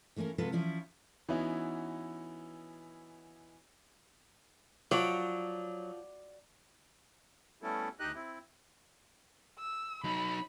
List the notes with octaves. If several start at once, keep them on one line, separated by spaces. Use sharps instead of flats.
E3 A3 A#3 C#4 A#4
C3 F#3 G#3 F4 A4 B4
E3 F3 C#4 E4 F4
E3 B3 C#4 D#4 E4 F#4
F3 F#3 D5
G3 A3 B3 C#4 E4 A4
D2 D#4 G4 D#5 F#6
C4 E4
E6
F#3 D#4 B5